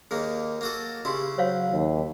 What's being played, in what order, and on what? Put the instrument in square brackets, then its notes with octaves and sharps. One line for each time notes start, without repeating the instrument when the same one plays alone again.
[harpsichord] D#2 D#3 A#3 [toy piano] G#4
[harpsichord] A#3 F#4 A4
[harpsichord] C#3 E4 [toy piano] F#4 G4
[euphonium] F#3 [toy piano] C5 C#5 F5
[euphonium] D#2